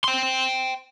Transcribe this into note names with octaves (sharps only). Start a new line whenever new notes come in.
G5 C6